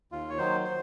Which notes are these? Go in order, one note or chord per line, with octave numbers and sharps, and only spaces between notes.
D#2 F4
C#5
D#3 F#3 C5
C5